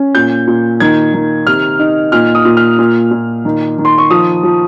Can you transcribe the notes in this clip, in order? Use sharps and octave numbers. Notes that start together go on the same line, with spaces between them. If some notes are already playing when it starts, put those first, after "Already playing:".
Already playing: C#4
A#2 G6
A#2
D#3 G#6
D#3
C3 F6
D#4
A#2 F6
D#6
A#2
F6
A#2
A#2
D#3
D#3
C6
C#6
F3 D#6
F3